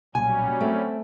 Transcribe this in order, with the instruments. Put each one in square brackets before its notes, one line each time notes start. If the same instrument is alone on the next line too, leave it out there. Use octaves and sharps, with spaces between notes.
[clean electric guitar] B1 A#2 [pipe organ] F#3 G3 C#4 [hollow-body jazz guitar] G#5
[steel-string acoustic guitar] A3 [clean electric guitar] C4